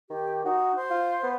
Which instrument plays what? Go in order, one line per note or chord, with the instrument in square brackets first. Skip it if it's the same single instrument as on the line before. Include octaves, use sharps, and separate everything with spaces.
[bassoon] D#3 [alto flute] G4
[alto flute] D#4 [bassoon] F#4
[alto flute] C5
[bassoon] F4
B3